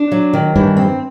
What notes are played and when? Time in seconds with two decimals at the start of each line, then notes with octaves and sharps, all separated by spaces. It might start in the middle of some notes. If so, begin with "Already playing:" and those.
Already playing: D4
0.12 F#3
0.33 D#3
0.56 G2 E3
0.77 C4